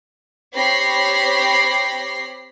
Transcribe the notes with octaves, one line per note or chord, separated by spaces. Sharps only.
C4 G4 C#5 B5 A#6 C7